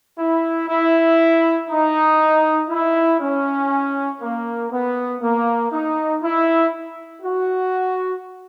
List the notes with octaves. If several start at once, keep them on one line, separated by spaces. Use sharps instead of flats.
E4
E4
D#4
E4
C#4
A#3
B3
A#3
D#4
E4
F#4